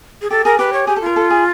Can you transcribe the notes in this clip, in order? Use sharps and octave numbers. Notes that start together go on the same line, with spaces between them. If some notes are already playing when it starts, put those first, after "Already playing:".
G#4
G4 A4
G#4 A#4
G4 B4
C#5
G4 G#4
A4
F4 A#4
A4
G#4